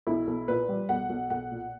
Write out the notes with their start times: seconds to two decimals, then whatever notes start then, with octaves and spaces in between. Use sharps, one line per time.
0.07 B1 E4
0.27 B1
0.48 A#2 B4
0.69 G3
0.89 B1 F#5
1.10 B1
1.30 B1 F#5
1.51 A#2